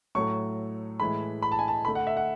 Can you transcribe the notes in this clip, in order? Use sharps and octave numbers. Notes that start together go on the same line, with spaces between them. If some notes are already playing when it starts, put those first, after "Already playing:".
A2 F#3 A3 C#6
A2 E3 G#3 B5
B5
A5
G#5
A5
D3 A3 B5
F#5
E5
F#5